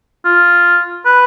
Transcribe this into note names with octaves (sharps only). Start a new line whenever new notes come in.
F4
B4